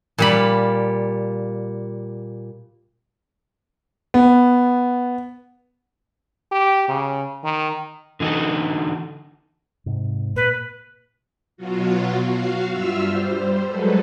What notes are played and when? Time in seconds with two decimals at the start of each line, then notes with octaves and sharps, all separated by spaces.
0.18 A#2 G3 B5
4.14 B3
6.52 G4
6.88 C#3
7.44 D#3
8.20 D3 E3 D#4 F#4 A4
9.86 G#2 C3
10.36 A#2 B4
11.57 B2 F#3 F4 F#4
12.26 F#4 F5
12.71 G2 F4 E5 E6 F6
13.04 G3 C5
13.66 F#3 G#3 A4 B4